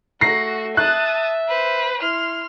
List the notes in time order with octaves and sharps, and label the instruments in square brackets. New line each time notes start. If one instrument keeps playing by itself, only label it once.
[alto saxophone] A3 [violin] F#4 [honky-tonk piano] A#6 C7
[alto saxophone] E5 [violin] A5 D#6 [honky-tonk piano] F#6
[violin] B4 C5
[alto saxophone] E4 [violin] C6 F6